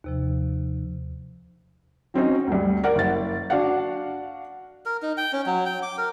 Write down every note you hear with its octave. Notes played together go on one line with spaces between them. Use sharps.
D#2 C3 F3
F#3 C4 C#4 D#4
D2 G2
A#4 D5 F#5
F#1 A6
D4 F#4 D5 F5 F#5
A#4
D#4
G5
C#4
F#3
G5
D6
A#4